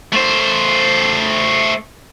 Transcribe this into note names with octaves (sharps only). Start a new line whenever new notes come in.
A3 C5